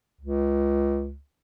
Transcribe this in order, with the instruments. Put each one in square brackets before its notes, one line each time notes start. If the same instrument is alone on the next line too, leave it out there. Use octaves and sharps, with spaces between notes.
[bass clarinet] C#2